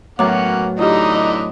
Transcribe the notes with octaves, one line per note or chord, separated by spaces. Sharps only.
A2 F#3 A#3 B3 C#4 F#5 A#5 D6
D3 E3 D#4 F4 G4 D#5